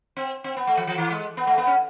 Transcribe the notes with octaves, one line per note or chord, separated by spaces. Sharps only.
C4
C4
B3
A3
F3
F3
E3
G#3
B3
A3
B3
C#4